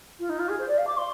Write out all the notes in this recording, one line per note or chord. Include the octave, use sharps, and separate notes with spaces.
F4
D#4
F4
G#4
C5
D5
F5
D6
C6